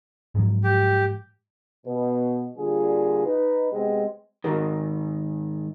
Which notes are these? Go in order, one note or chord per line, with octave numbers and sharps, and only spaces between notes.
G#2 F3 F#3
G4
B2
A#2 D3 G3 F4 G#4
D#4 B4
C3 G#3 B3 C4
G#2 D#3 F#4 A#4